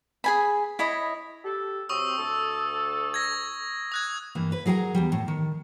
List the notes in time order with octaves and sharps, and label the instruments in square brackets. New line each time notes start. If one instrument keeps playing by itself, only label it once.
[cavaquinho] G#4 G#5 B5
E4 C#5 D#5 B5
[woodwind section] G4 A4
[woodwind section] C3 F#3 C4 [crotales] C#6 D#6 E6
[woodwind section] D2 A4
[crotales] G#6 A#6
D#6 F#6 G#6
[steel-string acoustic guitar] G2 E3 A#3
B4
F#3 G#4 A#4 F#5 A#5
E2 D#3 G3
A2
D#3